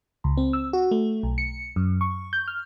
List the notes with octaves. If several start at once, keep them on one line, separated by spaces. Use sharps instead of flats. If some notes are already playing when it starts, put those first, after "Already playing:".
C#2
C4
E6
F#4
A3
B1
C#7
F#2
C#6
G6
F6